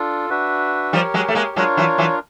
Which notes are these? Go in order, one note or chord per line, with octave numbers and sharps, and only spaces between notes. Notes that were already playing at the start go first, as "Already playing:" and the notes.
Already playing: D4 F4 A4
D4 F#4 B4 E5
F3 G3 G4 A#4 C#5
F#3 G#3
A3
G#3 A#3
F#3 G#3 D4 F4 A#4 C#5
E3 F#3
E3 F#3